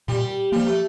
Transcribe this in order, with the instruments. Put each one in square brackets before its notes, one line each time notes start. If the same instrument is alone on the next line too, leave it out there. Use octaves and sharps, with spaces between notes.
[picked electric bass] A#2 [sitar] G3
[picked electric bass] F3 A#3 [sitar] G3
[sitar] A3